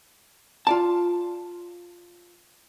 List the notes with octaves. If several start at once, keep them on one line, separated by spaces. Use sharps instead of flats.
F4 D5 A5